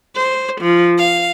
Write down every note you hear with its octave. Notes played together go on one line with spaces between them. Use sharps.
C5
F3
F5